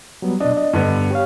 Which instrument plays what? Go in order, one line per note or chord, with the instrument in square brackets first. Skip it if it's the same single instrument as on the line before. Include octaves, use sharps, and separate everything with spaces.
[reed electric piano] F#3 G3 B3
[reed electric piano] B2 D#5 [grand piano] D4
[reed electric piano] D#5
[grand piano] G2 D3 B3
[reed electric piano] G4 C#5 F5